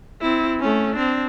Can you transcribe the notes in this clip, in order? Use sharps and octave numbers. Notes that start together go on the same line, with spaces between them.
C4 E4
A3 C#4
C4 D4